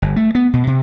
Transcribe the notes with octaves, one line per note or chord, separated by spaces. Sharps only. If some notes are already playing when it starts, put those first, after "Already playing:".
G1
A3
B3
B2
C3